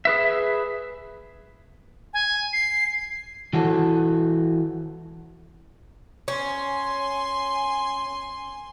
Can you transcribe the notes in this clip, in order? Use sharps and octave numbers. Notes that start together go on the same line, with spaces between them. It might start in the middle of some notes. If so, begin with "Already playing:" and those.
G#4 B4 E5
G#5
C7
E3 F#4 A4
C#4 G#5 C6